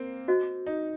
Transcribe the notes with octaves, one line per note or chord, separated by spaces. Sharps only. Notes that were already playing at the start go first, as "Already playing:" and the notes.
Already playing: A#3 C4
F#4 C5 D#5
D#4